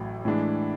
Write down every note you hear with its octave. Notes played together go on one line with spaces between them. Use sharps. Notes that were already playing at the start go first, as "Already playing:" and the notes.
Already playing: A1 A2 F#3
A2 E3 G#3 D4